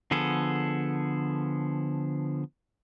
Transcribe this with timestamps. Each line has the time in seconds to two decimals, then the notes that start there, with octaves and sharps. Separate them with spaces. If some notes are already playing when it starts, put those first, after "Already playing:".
0.11 D3 F3 B3 G#4 A4